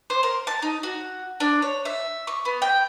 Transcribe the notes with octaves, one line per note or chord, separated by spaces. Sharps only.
C5
A#4
A5
D#4
F#4
D4
C#5
E5
C#6
B3
G5